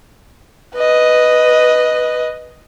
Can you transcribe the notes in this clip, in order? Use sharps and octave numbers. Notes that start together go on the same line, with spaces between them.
B4 D#5